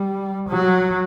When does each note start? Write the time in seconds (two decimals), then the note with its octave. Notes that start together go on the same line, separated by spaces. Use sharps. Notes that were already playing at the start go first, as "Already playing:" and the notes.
Already playing: G3
0.49 F#3